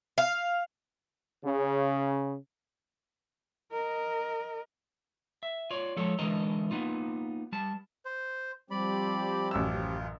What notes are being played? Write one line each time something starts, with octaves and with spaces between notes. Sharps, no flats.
F5
C#3
A#4 D#5
E5
F4 C#5 D5
F3 G#3 A4 C#5
D3 E3 G#3 A#4 D#5 A#5
A#3 B3 D#4 F4
G3 A5
C5
F3 G3 C4 G4 D5 B5
A1 F#2 F4 E6